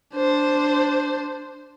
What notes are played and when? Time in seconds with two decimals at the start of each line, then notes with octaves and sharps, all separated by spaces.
0.15 D4 C5